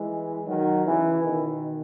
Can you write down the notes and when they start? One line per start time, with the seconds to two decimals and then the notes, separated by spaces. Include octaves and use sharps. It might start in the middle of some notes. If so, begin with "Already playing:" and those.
Already playing: E3 G#3
0.47 D#3 F#3
0.85 C#3 E3
1.23 B2 D#3